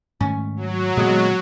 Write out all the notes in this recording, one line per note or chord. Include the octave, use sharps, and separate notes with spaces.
G#2 D#3 A3 C#4
F#3
A#2 D3 E3 G#3 B3